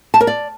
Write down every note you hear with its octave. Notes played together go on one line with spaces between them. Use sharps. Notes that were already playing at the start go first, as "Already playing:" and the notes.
A5
A#4
D5